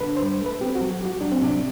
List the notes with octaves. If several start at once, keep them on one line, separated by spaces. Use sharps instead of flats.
D3 B4
C5
G2
A3 B4
C4 G4
F#4
F#3
F#4 G4
F#3 D4
C4
C3 D4